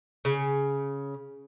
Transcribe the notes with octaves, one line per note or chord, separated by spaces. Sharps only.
C#3